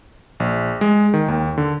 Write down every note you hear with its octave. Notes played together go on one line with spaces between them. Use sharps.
A#1
G#3
D#3
D#2
D3